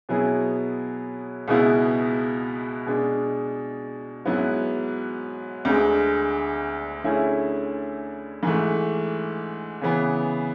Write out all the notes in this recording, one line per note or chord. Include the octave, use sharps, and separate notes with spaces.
B2 F#3 B3 E4 G#4
C#2 B2 G#3 B3 E4
B2 G#3 D4
G#2 F#3 B3 E4
D2 D3 G#3
D3 A3 C#4 E4 G#4
G#2 E3 A3
C#3 E3 B3